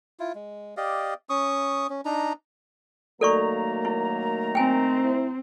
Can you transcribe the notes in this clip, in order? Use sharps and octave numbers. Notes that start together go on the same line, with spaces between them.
E4 F4
G#3
G4 D5 D#5 F5
C#4 C#6 D#6
C#4
D4 D#4 A#5
D#3 F#3 A3 A#3 A4 D5 A#5 C#6
E4
C4 G5 G#5
E4 C5